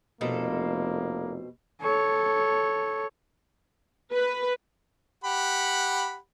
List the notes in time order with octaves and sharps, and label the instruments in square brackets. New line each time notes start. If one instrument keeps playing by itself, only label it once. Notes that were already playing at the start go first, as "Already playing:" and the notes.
[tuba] F1 [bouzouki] B2 C4 A4 [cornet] A#3
[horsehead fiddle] A4 C#5
[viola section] B4
[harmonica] G4 F#5 B5